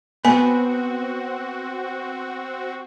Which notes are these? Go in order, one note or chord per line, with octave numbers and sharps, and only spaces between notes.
B3 C4 F#4 G#5